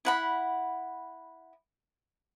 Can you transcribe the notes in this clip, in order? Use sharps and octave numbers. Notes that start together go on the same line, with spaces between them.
E4 F#5 B5